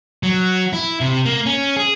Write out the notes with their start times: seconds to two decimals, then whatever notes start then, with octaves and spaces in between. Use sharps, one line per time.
0.23 F#3
0.73 E4
1.01 C3
1.25 A#3
1.46 C#4
1.77 G#4